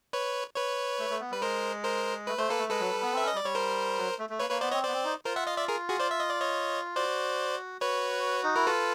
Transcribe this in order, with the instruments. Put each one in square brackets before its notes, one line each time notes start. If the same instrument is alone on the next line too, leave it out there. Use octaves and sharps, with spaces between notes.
[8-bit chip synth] B4 C#5
B4 C#5
[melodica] A3
A3
B3
[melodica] G3 [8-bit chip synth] B4
[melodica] G#3 [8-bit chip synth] A#4 C5
[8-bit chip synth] A#4 C5
[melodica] A3 [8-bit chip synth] B4
[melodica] A3 [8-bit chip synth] C5
[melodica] A#3 [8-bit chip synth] A4 B4
[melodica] A3
[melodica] G#3 [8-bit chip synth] A4 B4
[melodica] F#3
G3
B3
[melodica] C4 [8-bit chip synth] E5
[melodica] C#4
[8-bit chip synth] D#5
[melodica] G3
[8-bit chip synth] D5
[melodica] G3 [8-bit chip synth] C#5
[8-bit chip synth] A#4 C5
[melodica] F#3
A3
A3
[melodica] A#3 [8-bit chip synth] B4 C#5
[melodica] A#3 [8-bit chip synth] B4 C#5
[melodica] B3 [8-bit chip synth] C5 D5
[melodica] C4 [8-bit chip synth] C#5 D#5
[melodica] B3 [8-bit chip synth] C5 D5
[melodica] C4
D#4
[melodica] F4 [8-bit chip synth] A#4 C5
[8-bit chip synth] E5 F#5
D#5 F5
D5 E5
G#4 A#4
F#4 G#4
C5 D5
E5
D#5
D5
C#5 D#5
[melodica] F#4 [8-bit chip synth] C5 D5
[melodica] F#4 [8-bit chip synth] B4 C#5
[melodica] D#4
[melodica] E4 [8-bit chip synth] A#4
[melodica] F4 [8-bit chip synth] A4 B4